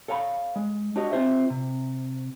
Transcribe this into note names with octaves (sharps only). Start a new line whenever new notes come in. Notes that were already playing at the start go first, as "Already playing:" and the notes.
A4 C#5 F5 A5 B5
G#3
D4 F#4 G4 C#5 D#5
C4 F4 C5 E5
C3